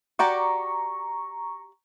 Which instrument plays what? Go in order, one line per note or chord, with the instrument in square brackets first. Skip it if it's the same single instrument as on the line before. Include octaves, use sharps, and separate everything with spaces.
[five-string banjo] F#4 G4 D5 [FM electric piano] A#5 C#6